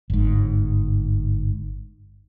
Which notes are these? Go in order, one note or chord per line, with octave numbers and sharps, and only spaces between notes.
G1 G#2